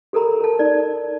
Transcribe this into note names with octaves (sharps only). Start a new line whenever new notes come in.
G4 A4 A#4 A#5 B5
A#4 A5
D#4 D5